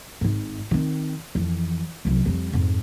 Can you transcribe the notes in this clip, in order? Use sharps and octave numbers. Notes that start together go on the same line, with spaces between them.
G#1 G#2
D#3 C4
F2 E3
C2 F#2
F2 G3
F2 G#2